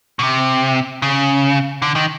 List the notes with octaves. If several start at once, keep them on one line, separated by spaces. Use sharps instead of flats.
B2
C3
C#3
D3
D#3